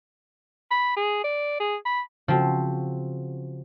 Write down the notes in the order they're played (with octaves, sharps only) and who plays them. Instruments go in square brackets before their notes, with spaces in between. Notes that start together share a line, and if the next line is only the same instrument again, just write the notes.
[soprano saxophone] B5
G#4
D5
G#4
B5
[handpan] C#3 F#4 [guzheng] F3 C4